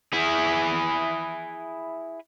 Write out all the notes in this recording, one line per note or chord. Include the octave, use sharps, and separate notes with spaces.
E4 G#4